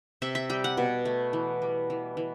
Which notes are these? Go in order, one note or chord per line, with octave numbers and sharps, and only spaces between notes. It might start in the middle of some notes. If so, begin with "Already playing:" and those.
C3 E5
E5
G3 G5
F#5
B2
A3
E3
G3
E3
E3